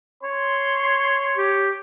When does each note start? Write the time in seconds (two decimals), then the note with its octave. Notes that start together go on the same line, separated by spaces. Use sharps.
0.23 C#5 C6
1.37 G4